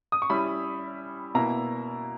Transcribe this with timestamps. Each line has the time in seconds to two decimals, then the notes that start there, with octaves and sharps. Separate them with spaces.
0.12 D#6
0.22 C#6
0.30 G3 C#4 E4 B5
1.35 B2 A#3 E4 A#5